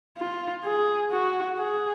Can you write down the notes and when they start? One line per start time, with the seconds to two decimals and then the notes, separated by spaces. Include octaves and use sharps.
0.17 F4
0.64 G#4
1.11 F#4
1.58 G#4